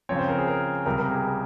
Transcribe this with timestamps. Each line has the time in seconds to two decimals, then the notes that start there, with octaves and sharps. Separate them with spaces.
0.09 C#3 F3 C4 C#5
0.19 C5
0.29 A#4
0.38 G#4
0.48 A#4
0.86 C#2 C3 G3 A#4
0.98 A#4
1.11 G#4
1.25 G#4